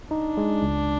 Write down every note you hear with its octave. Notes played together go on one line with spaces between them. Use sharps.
D4 D#4
G#3
C#2